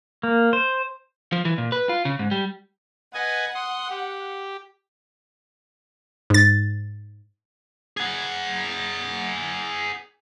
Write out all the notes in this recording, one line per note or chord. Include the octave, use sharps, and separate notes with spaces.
A#3
C5
F3
E3
A#2
B4
F4
C#3
G#2
G3
B4 D#5 F#5 G#5
C6 D#6
G4
G#2 A6
G#4 F#5